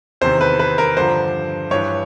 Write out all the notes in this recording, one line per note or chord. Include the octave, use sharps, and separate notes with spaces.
E2 C3 D#3 C5
B4
B4
A#4
G2 D3 F3 C5
G2 E3 C#5